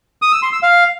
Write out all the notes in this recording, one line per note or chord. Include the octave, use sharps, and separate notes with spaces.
D#6
E6
C6
E6
F5